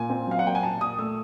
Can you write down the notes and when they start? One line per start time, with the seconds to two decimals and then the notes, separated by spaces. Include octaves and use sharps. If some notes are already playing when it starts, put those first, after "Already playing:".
Already playing: A#2 G#5
0.10 C4
0.27 F#3 F5
0.39 F#5
0.45 A#3 G5
0.55 G#5
0.63 A#2 A5
0.81 A#2 D#6
0.99 A3 E6